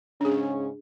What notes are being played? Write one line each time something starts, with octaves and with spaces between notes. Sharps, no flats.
G#2 C#3 C#4 D4 G#4